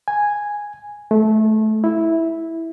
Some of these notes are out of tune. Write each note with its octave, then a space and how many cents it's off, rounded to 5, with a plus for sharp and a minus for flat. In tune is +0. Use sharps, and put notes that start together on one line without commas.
G#5 -5
A3 -20
E4 -5